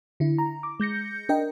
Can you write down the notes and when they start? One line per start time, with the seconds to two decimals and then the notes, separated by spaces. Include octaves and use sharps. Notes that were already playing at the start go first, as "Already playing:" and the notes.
0.20 D3 E4
0.38 A#5
0.63 D6
0.80 G#3 G6 A#6 C#7
1.29 D4 A#4 D#5 G5